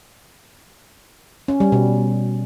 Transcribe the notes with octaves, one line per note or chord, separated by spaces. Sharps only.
C#4
G3
B2